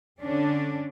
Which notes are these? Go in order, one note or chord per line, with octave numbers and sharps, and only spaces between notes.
D3 C#4 D4